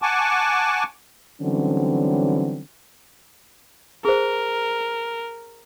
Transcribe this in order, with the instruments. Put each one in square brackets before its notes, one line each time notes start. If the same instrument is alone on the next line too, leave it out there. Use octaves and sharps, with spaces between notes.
[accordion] F#5 G#5 A5 C#6 D6
[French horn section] D3 E3 F#3 G3 C4 C#4
[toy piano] G#4 C5 [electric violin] A#4